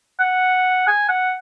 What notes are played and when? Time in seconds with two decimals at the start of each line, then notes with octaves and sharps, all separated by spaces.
0.20 F#5
0.87 G#5
1.09 F#5